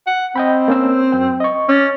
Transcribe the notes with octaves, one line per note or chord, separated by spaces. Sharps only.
F#5
C4 D#5 G5 B5
A#3 C#4 E6
F#2 G5
D#5 C#6
C#4 D6 A6